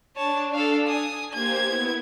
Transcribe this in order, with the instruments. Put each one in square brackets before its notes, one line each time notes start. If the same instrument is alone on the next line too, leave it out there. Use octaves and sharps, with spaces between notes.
[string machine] D4 [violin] C#5 A5
[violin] A4 F5
G#5 D#6
[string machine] A#3 G4 C5 [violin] G#6
[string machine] B3 E4